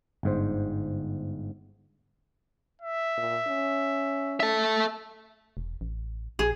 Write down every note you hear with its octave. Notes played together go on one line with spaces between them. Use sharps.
G1 G#2 C5
E5
A#2
C#4
A4 E5
E1
A1
A#1 G#4